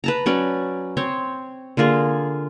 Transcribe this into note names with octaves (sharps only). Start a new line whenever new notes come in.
B4 A5 A#5
F#3 C#4 D5
C4 C5 C#5
D3 A#3 F4 G#4